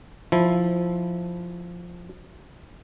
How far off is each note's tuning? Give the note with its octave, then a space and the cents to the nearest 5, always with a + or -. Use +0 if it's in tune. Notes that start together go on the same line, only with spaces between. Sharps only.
F3 +0 E4 +0